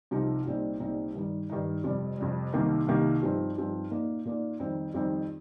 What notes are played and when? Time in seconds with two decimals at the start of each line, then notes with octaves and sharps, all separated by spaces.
0.11 C2 C3 F3 D#4
0.45 C2 A#2 G3 C4 D#4
0.80 C2 A#2 G3 C4 D#4
1.14 G2 D#3 G3 D#4
1.50 G2 D#3 G3 D#4
1.84 F2 C3 G3
2.17 F2 C3 G3
2.53 C2 C3 D#3 A#3 D#4
2.86 C2 C3 D#3 A#3 D#4
3.22 G2 F3 C4 D#4
3.56 G2 F3 C4 D#4
3.90 A#2 A#3 D#4
4.25 A#2 A#3 D#4
4.59 F2 D#3 G3 C4 D#4
4.94 F2 D#3 G3 C4 D#4